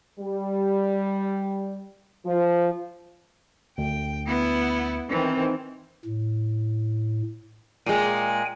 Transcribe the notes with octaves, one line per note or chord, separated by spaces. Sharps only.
G3
F3
D2 G5
B3 E4
D#3 E3 C4
A2
A#2 G#3 G5 G#5